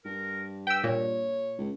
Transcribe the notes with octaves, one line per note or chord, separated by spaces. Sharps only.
G2 A#4
B4 G5 E6
A#2 C#5
C#2